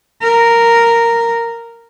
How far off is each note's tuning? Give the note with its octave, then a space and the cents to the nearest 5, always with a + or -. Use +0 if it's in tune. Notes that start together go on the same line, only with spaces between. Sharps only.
A#4 -5